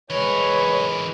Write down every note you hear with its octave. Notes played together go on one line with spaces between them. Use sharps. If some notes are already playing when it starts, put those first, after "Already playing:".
E3 G#3 A#4 B4 C#5